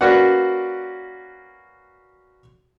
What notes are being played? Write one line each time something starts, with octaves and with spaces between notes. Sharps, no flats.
A#3 C#4 F#4 B4 D5 F#5